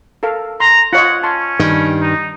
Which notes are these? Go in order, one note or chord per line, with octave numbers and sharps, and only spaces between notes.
A4 A#4 F5
A#5 C6
F4 C#5 D#5 F#5
C#4 A5 C6
G2 D#3
D#4